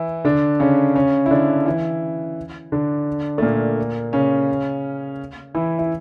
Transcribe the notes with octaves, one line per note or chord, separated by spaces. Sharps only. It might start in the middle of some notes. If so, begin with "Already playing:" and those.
Already playing: E3 E4
D3 D4
C#3 C#4
C#3 C#4
E4
D3 D4
E3 E4
D3 D4
A3
A#2 A#3
C#3 C#4
E3 E4
E4